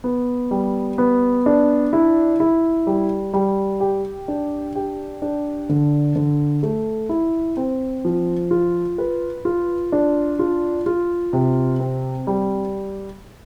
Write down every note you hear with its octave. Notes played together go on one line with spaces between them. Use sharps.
B3
G3
B3
D4
E4
E4
G3
G3
G4
D4
G4
D4
D3
D3
A3
E4
C4
F3
F4
B4
F4
D4
F4
F4
C3
C4
G3